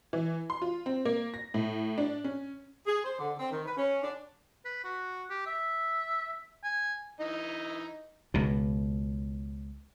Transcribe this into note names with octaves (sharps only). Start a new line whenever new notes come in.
E3
C6
F4
C4
A#3
A#6
A2
D4
C#4
G#4
C5
D3
C4
D#3
B4
C#4
D4
B4
F#4
G4
E5
G#5
E3 D#4 D#5
C#2 B2